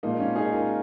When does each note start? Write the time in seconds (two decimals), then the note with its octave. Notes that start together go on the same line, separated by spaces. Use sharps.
0.03 A#2 F3 G#3 A#3 D#4
0.20 C#4 F4
0.36 D#4 G#4
0.52 F4 A#4